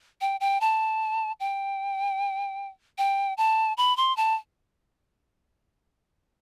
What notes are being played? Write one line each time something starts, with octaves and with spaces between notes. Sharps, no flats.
G5
G5
A5
G5
G5
A5
B5
C6
A5